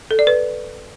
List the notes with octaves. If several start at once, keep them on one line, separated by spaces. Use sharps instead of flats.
A4
D5
B4